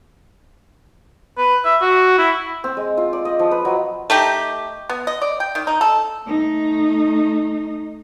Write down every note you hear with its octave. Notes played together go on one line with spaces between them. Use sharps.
B4
E5
F#4
E4
C4
G#3
F4
D5
D#5
F3
B4
F#3
A3 D#4 G4
B3
D#5
D5
G5
D#3
D#4
A4
A3 D#4